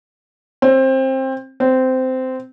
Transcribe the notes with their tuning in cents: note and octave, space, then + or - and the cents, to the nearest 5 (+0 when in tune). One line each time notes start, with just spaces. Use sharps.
C4 +20
C4 -15